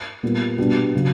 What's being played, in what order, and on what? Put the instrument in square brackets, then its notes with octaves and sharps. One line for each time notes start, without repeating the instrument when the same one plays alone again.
[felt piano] A#2 G3 B3
B2 G3 B3 D4
C#3 F#3